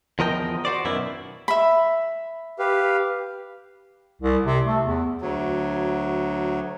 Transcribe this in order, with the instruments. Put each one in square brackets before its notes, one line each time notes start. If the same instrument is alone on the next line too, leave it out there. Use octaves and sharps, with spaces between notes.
[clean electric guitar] E2 F3 A#4 D#5 G5
F#4 C5 D5
F#2 B2 D#3 E4
[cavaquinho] E5 B5
[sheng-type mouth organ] G4 B4 F5
[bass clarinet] C2
C3
A3
E2
[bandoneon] D2 F#3